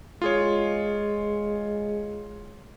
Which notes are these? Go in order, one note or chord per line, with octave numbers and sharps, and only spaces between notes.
G#3 F4 G#4 C#5